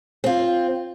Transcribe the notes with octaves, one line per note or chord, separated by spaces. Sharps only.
C4 F4